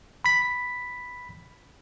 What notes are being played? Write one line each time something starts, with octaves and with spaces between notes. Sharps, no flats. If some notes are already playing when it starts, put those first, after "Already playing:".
B5 B6